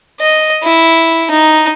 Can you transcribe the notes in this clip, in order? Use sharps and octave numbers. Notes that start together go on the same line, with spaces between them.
D#5
E4
D#4